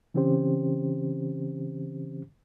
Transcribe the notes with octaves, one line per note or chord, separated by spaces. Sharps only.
C#3 E3 C4 C#4 G4 C5